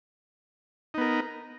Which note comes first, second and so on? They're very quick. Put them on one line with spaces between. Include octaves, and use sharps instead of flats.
D#4 B3 A#4